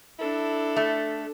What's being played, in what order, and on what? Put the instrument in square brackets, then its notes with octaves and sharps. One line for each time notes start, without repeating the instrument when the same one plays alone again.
[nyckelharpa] D4 A4 [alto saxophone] E4
[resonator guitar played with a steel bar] A3